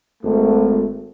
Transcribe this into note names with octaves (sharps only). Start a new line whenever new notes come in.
G#1 A3